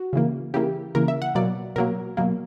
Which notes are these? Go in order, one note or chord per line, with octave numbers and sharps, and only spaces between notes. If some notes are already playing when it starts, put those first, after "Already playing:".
Already playing: F#4
C#3 E3 A#3
C#3 E3 A#3 G4
C#3 E3 A#3 A#4
E5
F#5
B2 F#3 A#3 D5
B2 F#3 A#3 A#4
B2 F#3 A#3